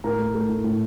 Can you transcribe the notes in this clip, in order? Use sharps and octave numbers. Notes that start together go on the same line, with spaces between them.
A2 A#4
A3
A3
A2
A2